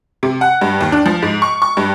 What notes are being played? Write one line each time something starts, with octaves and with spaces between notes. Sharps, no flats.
C3
F#5
G2
D#2
D4
F3
G#2
C#6
C#6
G2